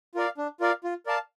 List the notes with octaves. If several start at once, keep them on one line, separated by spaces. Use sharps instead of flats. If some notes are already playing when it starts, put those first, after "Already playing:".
F4 A#4 D5 F5
D4
F4 A#4 D5 F5
F4
A#4 D5 F5 A5